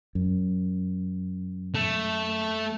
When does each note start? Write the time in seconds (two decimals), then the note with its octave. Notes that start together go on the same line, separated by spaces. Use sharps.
0.15 F#2
1.75 A3